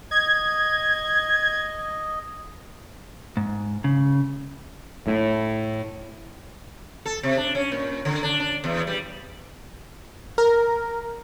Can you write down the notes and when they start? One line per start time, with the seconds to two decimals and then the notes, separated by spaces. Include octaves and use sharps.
0.11 D#5 G#6
3.37 G#2
3.84 C#3
5.07 A2
7.06 A4
7.23 C3
7.37 D4
7.55 C#4
7.72 A#2
8.05 D3
8.23 D4
8.40 D4
8.64 E2
8.87 G3
10.38 A#4